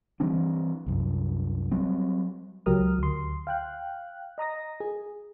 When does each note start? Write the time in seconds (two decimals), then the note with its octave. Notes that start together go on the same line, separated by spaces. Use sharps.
0.20 E3 G3 C4 D4
0.86 C2 F#2
1.71 F#3 G3 C4
2.66 C#2 F#3 G4 A#4 D#6 F6
2.99 D2 C6
3.47 F5 G5 F#6
4.38 D#5 A#5 D#6 A#6
4.80 G#4